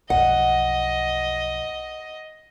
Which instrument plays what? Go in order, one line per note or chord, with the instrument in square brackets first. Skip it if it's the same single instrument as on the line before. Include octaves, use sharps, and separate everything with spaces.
[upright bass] B1 F2 [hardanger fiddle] D#5 [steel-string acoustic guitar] F#5